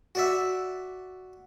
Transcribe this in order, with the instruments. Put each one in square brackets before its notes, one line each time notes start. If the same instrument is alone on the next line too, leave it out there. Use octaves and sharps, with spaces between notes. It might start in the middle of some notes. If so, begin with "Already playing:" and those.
[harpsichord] F#4 D5 E5